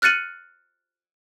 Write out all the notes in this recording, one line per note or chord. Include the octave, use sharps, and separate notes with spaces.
F6 F#6 A6 C#7 D#7 F#7